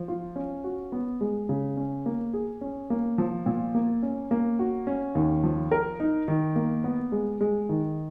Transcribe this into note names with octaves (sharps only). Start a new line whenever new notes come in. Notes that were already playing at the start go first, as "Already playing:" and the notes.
Already playing: F3
F4
C#4
F#4
B3
G#3
C#3
C#4
A#3
G#4
C#4
A#3
F3
A#2
A#3
C#4
A#3
F#4
C#4
D#2
F3
A#4
D#4
D#3
A#3
B3
G#3
G#3
D#3